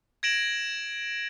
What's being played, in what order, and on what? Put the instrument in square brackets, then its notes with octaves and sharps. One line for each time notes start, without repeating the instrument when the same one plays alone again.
[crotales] G#6 A#6 D7 E7 F#7